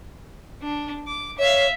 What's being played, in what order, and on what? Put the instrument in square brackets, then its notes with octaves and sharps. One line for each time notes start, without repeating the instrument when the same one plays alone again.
[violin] D4
D6
[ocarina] C#5 [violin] E5 F5